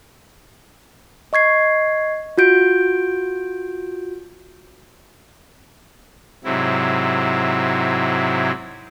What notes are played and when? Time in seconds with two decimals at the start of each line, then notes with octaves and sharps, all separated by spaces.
1.33 D#5 C#6 G#6 C7
2.38 F4 F#4 G6 D7
6.44 G#2 C3 F#3 E4